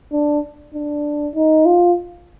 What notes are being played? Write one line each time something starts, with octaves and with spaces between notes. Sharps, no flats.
D4
D4
D#4
F4